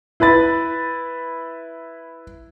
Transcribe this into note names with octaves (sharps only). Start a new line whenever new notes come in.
E4 B4 B5 A6